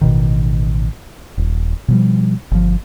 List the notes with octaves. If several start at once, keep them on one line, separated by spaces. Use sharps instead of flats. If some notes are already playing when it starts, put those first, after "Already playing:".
A1 B2 D#3
D#1
B2 F3 G3
G1 F3